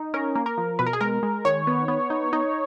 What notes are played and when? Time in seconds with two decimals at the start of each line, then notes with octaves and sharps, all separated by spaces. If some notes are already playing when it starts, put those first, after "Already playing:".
Already playing: D#4
0.14 C#4 A#4
0.35 A#3
0.46 A#4
0.58 F3
0.79 B2 B4
0.86 A#4
0.93 G#4
1.01 G#3 A#4
1.23 G#3
1.45 D#3 C#5
1.67 B3
1.88 B3
2.10 D#4
2.33 D#4